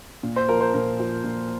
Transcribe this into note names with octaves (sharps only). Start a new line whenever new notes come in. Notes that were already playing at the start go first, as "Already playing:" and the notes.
A#2
C5
F3 A#4
C5
A#2 A#4
F3
A#2